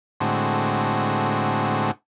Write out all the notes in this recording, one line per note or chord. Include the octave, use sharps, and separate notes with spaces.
A2 D3 G#3 C4 F#4